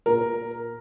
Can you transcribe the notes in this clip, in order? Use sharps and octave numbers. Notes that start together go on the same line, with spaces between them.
A#2 A#4